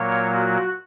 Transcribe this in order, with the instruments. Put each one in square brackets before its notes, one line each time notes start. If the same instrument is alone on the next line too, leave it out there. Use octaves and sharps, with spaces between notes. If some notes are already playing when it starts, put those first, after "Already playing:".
Already playing: [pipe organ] A#2 F#3 A#3 C#5
F#4